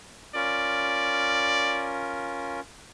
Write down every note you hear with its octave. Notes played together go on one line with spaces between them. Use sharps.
C#4 F4 A#4 D5